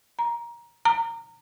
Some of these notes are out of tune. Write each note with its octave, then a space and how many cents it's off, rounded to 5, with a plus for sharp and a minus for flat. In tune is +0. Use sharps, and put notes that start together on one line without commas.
A#5 +15
A#5 -20